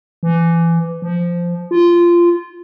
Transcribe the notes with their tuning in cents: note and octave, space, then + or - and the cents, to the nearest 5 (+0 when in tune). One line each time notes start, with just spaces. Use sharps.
E3 +25
F3 -10
F4 -15